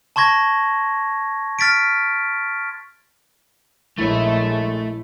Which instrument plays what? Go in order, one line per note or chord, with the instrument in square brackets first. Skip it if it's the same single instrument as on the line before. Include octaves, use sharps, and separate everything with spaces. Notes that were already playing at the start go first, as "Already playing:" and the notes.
[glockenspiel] A5 C6 C#6 G#6 A#6
F6 A6 B6 D7
[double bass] A#1 G#3 [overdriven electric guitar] A3 E5 [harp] E4 C#5